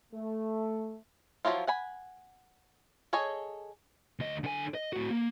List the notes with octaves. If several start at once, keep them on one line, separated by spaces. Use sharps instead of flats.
A3
F3 F#3 E4 F4
F#5 G#5 B5
G#4 A4 C#5 D#5 G#5
D2 D#5
D3 G#5
D#5
A2 F#4
A#3